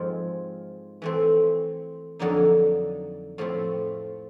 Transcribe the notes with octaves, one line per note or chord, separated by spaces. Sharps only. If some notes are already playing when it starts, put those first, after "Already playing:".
Already playing: G#2 F3 G#3 C4
E3 A3 C4
F2 D3 F#3 A#3 D#4
A2 F3 A3 C4